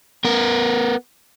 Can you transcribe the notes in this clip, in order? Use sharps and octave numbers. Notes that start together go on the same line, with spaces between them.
B3 A#4